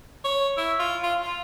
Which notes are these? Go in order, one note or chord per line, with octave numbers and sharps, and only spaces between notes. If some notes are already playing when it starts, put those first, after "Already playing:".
C#5
E4
F4
F4
F4